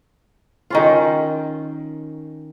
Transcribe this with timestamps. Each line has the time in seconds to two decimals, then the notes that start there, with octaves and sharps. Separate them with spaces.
0.70 D#3 C#4 F4